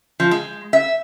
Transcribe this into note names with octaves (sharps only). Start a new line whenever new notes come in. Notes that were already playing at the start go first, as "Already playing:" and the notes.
F3
G#3
E5